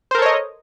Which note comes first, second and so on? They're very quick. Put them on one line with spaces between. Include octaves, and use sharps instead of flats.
C5 A#4 A4 C#5 D#5